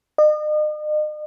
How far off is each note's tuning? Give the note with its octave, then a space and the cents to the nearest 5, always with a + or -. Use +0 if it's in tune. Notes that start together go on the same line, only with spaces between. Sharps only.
D#5 -40